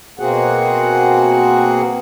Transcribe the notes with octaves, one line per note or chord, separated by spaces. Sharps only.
B2 A#3 C4 F#4 G#4 F#5